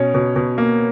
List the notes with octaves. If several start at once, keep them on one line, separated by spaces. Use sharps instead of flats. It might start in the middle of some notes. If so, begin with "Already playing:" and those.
Already playing: B2 C#4
B2
B2
A#3